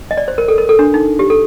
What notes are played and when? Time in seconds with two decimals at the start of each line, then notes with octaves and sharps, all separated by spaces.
0.11 D#5
0.17 D5
0.28 C5
0.38 A#4
0.48 A4
0.58 A#4
0.69 A4
0.79 D4
0.94 D#4
1.19 G4
1.30 A4